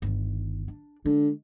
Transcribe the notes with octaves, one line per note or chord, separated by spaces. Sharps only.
G1 D#3
D4
D3 G#3